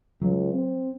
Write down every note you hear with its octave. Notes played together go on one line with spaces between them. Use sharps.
C#2 F#3
C4